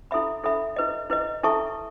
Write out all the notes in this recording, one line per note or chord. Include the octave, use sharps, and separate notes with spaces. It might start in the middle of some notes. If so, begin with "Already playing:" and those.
E4 A4 E5 B5
E4 A4 E5 B5
E4 B4 D#5
E4 B4 D#5
E4 A4 E5 A5 C#6